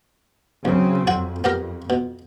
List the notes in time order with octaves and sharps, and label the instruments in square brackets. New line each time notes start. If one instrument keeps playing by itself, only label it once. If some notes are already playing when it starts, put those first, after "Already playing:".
[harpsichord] D2 [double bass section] C#3 F#3 C4
[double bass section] F2 [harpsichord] F#4 F#5 G5
[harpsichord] B3 G4 A#4
B2